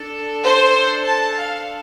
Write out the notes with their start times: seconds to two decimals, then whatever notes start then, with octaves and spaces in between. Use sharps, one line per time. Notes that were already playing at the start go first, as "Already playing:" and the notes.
Already playing: D4 A4
0.42 C5
1.05 A5
1.36 F5